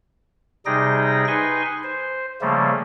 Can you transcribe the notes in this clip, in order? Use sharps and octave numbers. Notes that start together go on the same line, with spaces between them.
C3 G3 D#4 G#4 G5 A#6
D#4 B4 G#5 C6 C#6
C5
C#3 F3 G3 A3 A#3